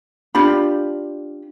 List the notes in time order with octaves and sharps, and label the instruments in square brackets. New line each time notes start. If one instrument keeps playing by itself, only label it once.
[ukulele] D4 F4 G4 B5